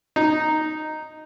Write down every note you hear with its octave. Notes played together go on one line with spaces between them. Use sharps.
D#4